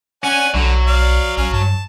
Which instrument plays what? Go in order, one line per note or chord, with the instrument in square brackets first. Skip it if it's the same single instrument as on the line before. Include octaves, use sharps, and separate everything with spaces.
[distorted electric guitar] C#4 [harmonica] D5 F#5 G#5
[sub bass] B1 [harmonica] D3 [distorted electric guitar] F#3
[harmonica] D5 F5
[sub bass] A#1 [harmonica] C#4 F5
[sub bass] G2 [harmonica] A5